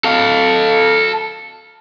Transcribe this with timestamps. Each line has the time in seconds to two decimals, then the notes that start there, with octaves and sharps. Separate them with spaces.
0.04 A4 F5